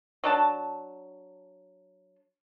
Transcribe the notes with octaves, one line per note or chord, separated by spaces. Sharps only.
F#3 D4 A5